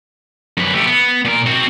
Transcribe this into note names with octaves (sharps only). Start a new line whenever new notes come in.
F#2 B4
A3 G4
B3
A#2 A#4
C4 F#4